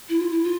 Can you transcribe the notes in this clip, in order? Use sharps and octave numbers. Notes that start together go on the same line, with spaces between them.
E4
F4
E4
F4